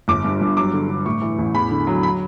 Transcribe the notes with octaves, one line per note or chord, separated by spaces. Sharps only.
G1 D6
G2
G2
F#3 D6
D3
D3
A2 C#6
E3
A1
E2 B5
D3
F#3
B5